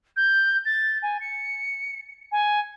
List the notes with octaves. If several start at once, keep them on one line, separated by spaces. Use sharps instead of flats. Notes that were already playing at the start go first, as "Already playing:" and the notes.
G6
A6
G#5
C#7
G#5